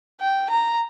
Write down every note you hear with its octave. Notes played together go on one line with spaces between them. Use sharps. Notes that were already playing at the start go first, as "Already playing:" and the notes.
G5
A#5